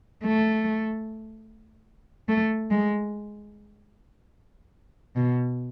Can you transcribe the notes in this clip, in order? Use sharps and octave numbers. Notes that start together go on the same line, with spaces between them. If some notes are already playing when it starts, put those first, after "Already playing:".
A3
A3
G#3
B2